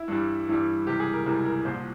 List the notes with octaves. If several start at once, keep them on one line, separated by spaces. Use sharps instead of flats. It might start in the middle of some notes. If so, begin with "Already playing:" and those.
Already playing: E4
G2 E3 G3
G2 E3 G3
C#2 C3 E3 G3 G4
G#4
A#4
C#2 C3 E3 G3 A#4
A#4
C2 A#2 F3 C5